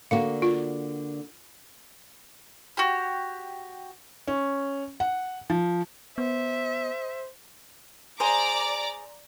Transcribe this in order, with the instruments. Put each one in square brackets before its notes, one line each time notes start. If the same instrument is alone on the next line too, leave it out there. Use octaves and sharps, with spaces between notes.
[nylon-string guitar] D3 A#3 F#4 [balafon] F5
[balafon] F4
[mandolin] F#4 G4
[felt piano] C#4
F#5
F3
[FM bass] B3 [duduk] C5 [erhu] E5
[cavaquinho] G#4 C5 [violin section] D5 A#5 D6